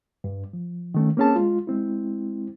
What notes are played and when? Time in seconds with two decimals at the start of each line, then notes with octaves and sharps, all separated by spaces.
0.24 G2
0.53 F3
0.94 D#3 A3 C#4
1.17 A#3 C4 C#4 G#4 A5
1.35 G#3 F4
1.67 G#3 C4 E4